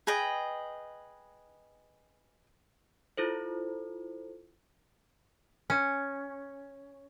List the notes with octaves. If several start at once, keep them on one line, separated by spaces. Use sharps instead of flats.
G#4 B4 D#5 G5
E4 F4 A4 C5
C#4